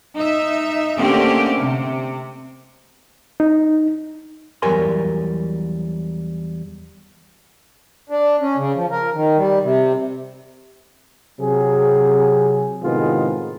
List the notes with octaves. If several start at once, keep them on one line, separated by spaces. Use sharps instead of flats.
D#4 E5
D3 A3 A#3 C4 C#4 G4
C3
D#4
E2 F#3 G3 A#4 G#5 C6
D4
C#4
C#3
F3
A#4
D#3
G3
C3
C3 F#3 G#4
A2 C3 D#3 G#3 B3 F4